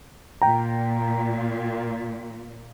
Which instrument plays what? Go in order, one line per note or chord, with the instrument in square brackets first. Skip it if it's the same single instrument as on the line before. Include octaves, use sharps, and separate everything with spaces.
[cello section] A#2 [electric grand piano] G5 A#5